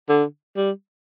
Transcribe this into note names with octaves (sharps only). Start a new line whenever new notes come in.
D3
G3